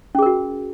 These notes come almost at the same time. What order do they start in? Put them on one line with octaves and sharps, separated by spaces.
C#4 G#4 A#4 F#4